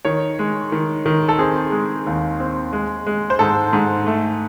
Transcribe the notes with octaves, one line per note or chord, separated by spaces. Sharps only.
D#3 C#5
G#3
D#3
D#3
A4
C4 G#4
G#3
D#2
C4
G#3
G#3
C5
G#2 A4
G#2
A3